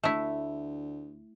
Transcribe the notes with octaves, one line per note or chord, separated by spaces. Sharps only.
D2 A3 E4